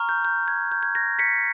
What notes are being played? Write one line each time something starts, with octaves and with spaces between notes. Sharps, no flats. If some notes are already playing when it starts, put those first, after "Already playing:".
Already playing: A#5 C#6 F6
G6
G6
G#6
G6
G#6
G#6 A#6
B6 C#7